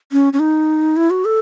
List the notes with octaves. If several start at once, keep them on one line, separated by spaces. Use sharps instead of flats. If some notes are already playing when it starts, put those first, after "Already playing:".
C#4
C#4
D#4
E4
F#4
A4